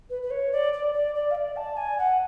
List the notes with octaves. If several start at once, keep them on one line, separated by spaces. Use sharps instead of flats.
B4
B4
C#5
D5
D5
D5
D5
F5
D5
A5
G#5
F#5